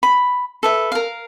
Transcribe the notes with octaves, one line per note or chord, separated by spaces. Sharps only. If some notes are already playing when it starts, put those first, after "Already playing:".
B5
A4 B4 E5
A#4 F5